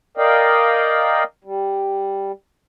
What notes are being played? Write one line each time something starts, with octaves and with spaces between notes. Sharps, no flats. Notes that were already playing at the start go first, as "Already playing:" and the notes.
A#4 D5 D#5 F5 G5
G3